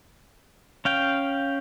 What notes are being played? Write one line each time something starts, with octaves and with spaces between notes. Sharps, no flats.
C#4 F5 G5